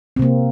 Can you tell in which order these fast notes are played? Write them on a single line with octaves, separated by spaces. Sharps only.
C4 C3 A#3